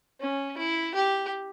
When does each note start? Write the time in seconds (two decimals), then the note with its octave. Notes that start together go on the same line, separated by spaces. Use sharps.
0.20 C#4
0.58 E4
0.95 G4